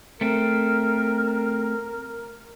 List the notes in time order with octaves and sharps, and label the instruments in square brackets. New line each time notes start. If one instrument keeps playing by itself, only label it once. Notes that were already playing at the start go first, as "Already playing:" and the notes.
[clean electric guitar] A3 C4 [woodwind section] A#4